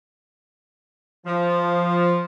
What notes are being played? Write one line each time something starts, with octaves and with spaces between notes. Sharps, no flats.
F3